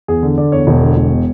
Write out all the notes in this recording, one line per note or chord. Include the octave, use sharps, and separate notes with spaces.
E2 G#4
D3
D3 D5
E2 C#5
E1
D3
E1
B2